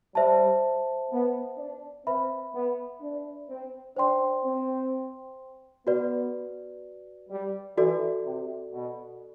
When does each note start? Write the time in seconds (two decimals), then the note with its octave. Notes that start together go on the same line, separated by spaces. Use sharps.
0.15 G3 C5 E5 A5
1.11 B3
1.59 D4
2.06 C4 B4 E5 B5
2.54 B3
3.01 D4
3.49 C4
3.97 D4 C5 G5 C6
4.44 C4
5.87 B3 F#4 B4 D5
7.30 G3
7.78 E3 F#4 A4 D5
8.25 C3
8.73 B2